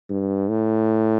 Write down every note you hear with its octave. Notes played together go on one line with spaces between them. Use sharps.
G2
A2